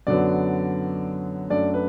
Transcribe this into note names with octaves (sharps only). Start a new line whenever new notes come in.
F#2 D3 F#3 B3 D5
F#2 F#3 A3 D4 D5
B4